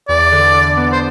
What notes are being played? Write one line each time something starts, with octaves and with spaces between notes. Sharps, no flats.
E2 D5
D3
D3
B3
C5